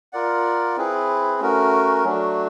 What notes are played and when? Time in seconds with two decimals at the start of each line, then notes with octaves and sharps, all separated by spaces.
0.13 F4 A#4 D5 F#5
0.77 C4 E4 G#4 B4
1.40 A3 C#4 F#4 A#4
2.04 F#3 A3 D4 F#4